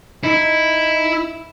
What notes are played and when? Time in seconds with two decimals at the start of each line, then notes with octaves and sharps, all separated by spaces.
0.24 D#4 E4